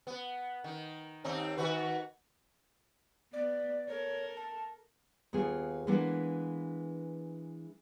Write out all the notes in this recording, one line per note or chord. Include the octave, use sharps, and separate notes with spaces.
B3
D#3
D#2 C4 D#4
D#3 F#4 B4
B3 D5
A4 A#4 C#5
A5
D#2 B3 F4 G#4
E3 G#3 A#3 B3 D4